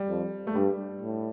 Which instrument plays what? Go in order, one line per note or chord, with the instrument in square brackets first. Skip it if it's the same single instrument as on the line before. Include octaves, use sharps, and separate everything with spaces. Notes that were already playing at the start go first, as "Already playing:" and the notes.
Already playing: [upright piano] G3
[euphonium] F2
[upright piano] A3
[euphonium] G2 [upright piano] G3
[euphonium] A2